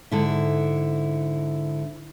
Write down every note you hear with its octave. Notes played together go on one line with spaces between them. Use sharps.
G#2 D3 E4